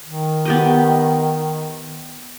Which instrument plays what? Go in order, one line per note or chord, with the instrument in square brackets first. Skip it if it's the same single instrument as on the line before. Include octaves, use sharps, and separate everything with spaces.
[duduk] D#3
[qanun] B3 G4 D#5